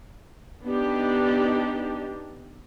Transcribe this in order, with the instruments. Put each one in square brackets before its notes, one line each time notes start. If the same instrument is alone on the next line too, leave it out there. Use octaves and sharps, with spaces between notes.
[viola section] B3 D4 D#4 G4